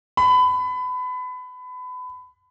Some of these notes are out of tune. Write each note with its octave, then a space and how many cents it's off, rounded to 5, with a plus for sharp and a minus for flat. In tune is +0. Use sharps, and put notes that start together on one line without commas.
B5 +25